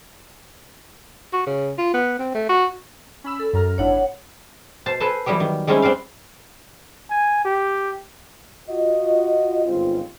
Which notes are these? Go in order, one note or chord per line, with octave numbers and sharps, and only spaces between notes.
F#4
C#3
F4
B3
C4
A3
F#4
C#4 B5 E6
A4
F#2 A#5 F6
G#1 D4 E4 C#5 F#5
B2 C5 A5
A4 B4 C5 G#5 A5
E3 F#3 G3 B3 G4
D#3
G3 G#3 C4 C#4 D#4 E4
C4 B4 D5 F5
G#5
G4
F4 F#4 D#5
G1 C#2 G#2 C4 F4